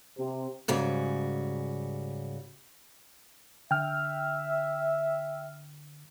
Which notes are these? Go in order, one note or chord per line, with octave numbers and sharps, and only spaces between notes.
C3
G#2 C#3 G3 F#4
D3 E5 G5 F6